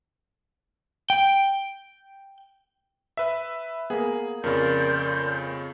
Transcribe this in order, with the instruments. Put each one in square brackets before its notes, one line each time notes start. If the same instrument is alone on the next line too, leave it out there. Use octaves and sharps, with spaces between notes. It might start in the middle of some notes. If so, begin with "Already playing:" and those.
[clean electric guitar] G5
[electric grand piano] B4 E5
[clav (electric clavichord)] A#3 B3 [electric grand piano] G#4
[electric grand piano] F2 C#3 [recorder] A#4 [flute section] D5 C6 G6